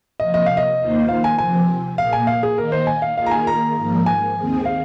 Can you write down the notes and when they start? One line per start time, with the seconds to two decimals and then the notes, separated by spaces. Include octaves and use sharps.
0.20 C3 F3 A#3 D#5
0.34 D#5
0.46 F5
0.57 D#5
0.79 D#2 D#3 A#3 F4 C5
1.09 F5
1.24 G#5
1.38 C3 F3 C4 G#5
1.98 A#2 A#3 G#4 F5
2.13 G#5
2.27 F5
2.43 G#4
2.57 D#3 A#3 D#4 A#4
2.72 C5
2.87 G#5
3.02 F5
3.17 D#3 A#3 F4 G#4 F5
3.26 A#5
3.31 G#5
3.47 A#5
3.76 G#2 F3 A#3
4.06 G#5
4.36 D#2 D#3 C4 G#4
4.65 F5